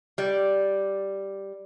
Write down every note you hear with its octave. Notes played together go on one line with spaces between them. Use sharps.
G3 D5